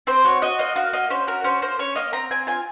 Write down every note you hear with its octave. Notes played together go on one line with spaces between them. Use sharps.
C4 C5
F#4 C#5
F#4 D#5
A#3 D#5
F#4 F5
A#3 D#5
C#4 C5
F#4 A#4
C#4 C5
A#3 C5
C#4 C#5
A#3 D#5
C4 A#5
C4 G#5
F4 G#5